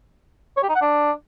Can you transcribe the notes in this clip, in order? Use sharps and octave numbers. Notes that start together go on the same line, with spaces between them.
C#5
G4
D#4
F#5
D4